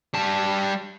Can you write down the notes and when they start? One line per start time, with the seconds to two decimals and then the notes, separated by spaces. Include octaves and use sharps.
0.14 G3 A5